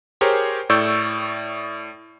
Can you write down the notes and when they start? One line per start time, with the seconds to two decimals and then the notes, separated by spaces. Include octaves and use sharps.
0.21 G4 G#4 A#4 C5 C#5
0.70 A2 D5 C#6 E6 G6